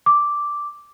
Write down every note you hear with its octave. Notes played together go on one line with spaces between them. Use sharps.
D6